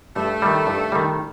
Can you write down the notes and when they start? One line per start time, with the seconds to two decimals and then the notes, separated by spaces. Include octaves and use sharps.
0.16 G2 A3
0.42 D#3 G3
0.67 G2
0.92 D#3 G3